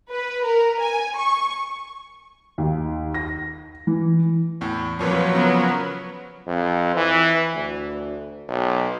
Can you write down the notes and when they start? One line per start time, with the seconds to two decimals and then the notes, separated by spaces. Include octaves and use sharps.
0.11 B4
0.44 A#4
0.81 G#5
1.16 C#6
2.58 D#2
3.14 A#6
3.87 E3
4.61 E2 A2
4.99 F2 A#2 F3 F#3 B4 C#5
5.35 C#3 B3 A#4
6.47 F2
6.96 E3
7.55 D2
8.49 B1